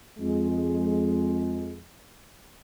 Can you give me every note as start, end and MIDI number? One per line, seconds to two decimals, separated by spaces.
0.19 1.80 41
0.19 1.80 56